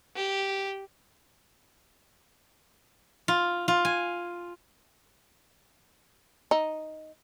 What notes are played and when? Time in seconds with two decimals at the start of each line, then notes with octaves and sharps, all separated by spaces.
0.15 G4
3.28 F4
3.68 F4
3.85 G#5
6.51 D#4